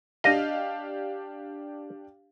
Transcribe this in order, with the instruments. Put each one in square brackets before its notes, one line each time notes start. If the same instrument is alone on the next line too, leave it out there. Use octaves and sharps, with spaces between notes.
[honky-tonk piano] D4 G4 F5 [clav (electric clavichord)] D#5